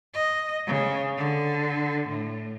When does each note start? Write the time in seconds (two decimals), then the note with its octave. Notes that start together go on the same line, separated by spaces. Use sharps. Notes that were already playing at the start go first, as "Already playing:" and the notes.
0.14 D#5
0.67 C#3
1.17 D3
2.08 A2